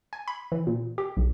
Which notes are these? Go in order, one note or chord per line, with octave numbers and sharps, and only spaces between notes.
G#5
B5
E3
A#2
G4
B1